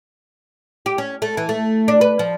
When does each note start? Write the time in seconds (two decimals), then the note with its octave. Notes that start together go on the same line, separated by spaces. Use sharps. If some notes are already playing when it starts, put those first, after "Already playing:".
0.86 G4
0.98 C#4
1.22 A3
1.37 E3
1.49 A3
1.88 D4
2.01 B4
2.19 F3